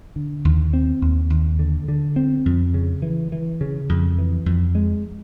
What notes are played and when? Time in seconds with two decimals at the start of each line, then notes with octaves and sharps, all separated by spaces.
0.16 D3
0.45 D#2
0.73 C4
1.01 D#2
1.30 D#2
1.59 D3
1.88 D3
2.16 C4
2.46 F2
2.74 C#3
3.02 E3
3.32 E3
3.61 C#3
3.89 F2
4.18 E3
4.46 F2
4.75 G#3